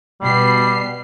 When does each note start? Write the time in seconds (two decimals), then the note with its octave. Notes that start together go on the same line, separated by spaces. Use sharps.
0.21 B2 G3 C7